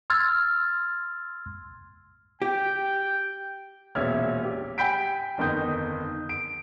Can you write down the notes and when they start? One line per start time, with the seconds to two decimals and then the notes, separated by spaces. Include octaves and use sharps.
0.10 C6 E6 F6 G#6 A6
2.42 G4 G5
3.95 E1 A#1 C#4 E5 F6 G#6
4.43 G4
4.78 G5 G#5 B5 G6 B6 D7
5.38 G1 F2 D#3 D#4 D#6 G6
6.29 D7